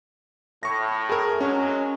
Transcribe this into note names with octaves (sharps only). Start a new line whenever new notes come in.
A2 C#6 A#6
G#4 A#4
F#3 G#3 C#4